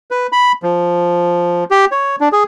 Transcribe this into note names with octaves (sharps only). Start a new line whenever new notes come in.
B4
B5
F3
G4
C#5
D4
G#4